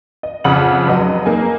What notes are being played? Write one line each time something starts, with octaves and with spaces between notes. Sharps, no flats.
D#5
F2 C#3 F#5 F#7
F1 F#3 D#5
A#3 D#4 G#4